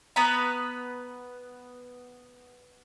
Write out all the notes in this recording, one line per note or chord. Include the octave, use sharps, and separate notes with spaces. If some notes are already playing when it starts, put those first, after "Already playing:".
B3 B4 A#5 B5